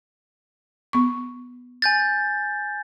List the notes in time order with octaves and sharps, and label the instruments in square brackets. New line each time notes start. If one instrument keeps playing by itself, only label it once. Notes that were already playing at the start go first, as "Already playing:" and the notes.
[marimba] B3 C#6
[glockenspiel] G#5 G6 A6